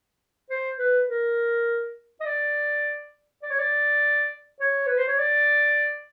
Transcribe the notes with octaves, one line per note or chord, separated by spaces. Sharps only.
C5
B4
A#4
D#5
D5
D5
C#5
D5
C#5
B4
C5
C#5
D5